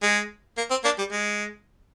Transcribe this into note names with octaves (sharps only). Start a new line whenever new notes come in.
G#3
A#3
C4
A#3 D4
G3
G#3